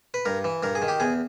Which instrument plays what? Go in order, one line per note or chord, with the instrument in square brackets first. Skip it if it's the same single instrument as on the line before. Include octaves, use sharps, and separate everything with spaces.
[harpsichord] B4
G2 A#4
E3
G2 A#4
G#4
D#3
G4
E2 G#4